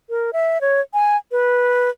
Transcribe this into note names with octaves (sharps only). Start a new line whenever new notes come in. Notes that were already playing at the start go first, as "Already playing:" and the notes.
A#4
E5
C#5
G#5
B4